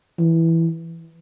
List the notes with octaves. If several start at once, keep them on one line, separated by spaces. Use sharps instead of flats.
E3